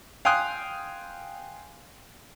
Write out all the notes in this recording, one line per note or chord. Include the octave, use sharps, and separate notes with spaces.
F5 G5 G#5 C6 D#6 F#6